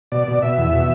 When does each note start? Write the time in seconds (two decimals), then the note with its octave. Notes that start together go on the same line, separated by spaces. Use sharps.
0.12 B2 D5
0.28 B2
0.42 B2 E5
0.58 E2
0.73 B2